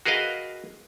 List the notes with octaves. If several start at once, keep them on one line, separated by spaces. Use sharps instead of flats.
F#4 G#4 A#4 B4 D#5 F5